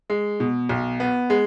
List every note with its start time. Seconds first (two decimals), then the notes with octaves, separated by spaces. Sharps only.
0.10 G#3
0.40 B2
0.69 B1
1.00 B3
1.30 G#3